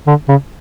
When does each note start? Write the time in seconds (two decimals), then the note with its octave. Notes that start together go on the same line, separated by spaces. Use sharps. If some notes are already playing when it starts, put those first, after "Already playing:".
0.07 D3
0.29 C#3